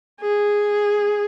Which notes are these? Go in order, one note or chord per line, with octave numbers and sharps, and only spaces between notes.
G#4